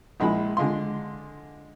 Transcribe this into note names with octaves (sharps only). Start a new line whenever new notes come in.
A#1 G#3 E4 B5
D3 G#3 F4 C6